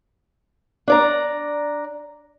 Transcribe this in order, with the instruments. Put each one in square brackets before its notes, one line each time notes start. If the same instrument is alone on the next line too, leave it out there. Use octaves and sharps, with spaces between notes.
[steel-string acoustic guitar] D4 D5 A#5